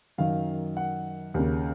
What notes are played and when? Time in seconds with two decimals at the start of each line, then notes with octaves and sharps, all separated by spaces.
0.18 F#2 D#3 F5
0.77 F#5
1.34 D#2 C#3